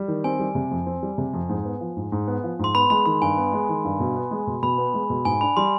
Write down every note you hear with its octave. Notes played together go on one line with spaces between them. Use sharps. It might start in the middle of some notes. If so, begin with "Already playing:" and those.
Already playing: G3
D#3
C4 G#5
G3
C3
F2
C4
G3
C3
F2
G#2
B3
F3
G#2
G#2
B3
F3
G#2 C6
B3 B5
G#3 B5
D#3 B5
G2 G#5
B3
G#3
D#3
G2
B2
B3
G#3
B2
B2 B5
B3
G#3
B2
G#2 G#5
D4 B5
G3 C6